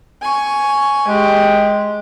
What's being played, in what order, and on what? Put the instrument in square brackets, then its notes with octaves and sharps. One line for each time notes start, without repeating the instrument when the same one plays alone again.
[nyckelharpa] G#5 C#6
[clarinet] G#3 [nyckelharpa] G4 G#4